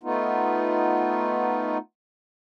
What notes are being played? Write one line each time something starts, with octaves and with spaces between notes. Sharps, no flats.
A3 B3 D#4 F4